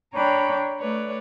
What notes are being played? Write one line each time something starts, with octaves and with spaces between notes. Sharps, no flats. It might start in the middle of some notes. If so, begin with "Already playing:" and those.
D4 C#5 G5 A#5 B5
A3 B4 C#5 D5